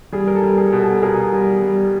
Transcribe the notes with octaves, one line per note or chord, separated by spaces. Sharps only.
G3 G#4
A#4
A4
G3
G#4
B2
A4
B2 G#4 A#4
G3
G3